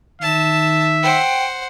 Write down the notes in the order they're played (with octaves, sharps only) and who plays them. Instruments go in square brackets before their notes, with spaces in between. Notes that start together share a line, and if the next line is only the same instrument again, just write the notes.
[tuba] D#3 [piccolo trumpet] E5 [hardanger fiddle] A5
[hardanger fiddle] C5 F#5 [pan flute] G5